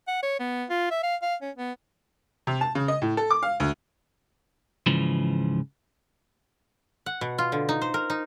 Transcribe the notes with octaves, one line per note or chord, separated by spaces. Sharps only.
F#5
C#5
B3
F4
E5
F5
F5
C#4
B3
C3
A5
C#3
D#5
A2
A4
D6
F5
D2
G#2 C#3 E3 F3
F#5
B2
F4
D3
D#4
C5
A#4
D#4